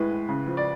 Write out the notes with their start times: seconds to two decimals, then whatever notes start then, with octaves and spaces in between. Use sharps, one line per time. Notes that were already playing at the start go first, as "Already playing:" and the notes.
Already playing: A2 G#3 B4
0.11 A2
0.29 C#3
0.47 F3
0.57 D5